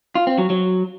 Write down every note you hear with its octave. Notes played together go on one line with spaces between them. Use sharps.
F4
C4
F#3
F#3